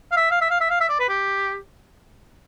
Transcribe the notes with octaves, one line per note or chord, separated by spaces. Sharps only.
F5
E5
F5
E5
F5
E5
F5
E5
D5
B4
G4